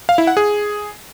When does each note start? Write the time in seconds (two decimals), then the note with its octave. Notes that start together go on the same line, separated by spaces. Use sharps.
0.09 F5
0.18 E4
0.27 F#5
0.37 G#4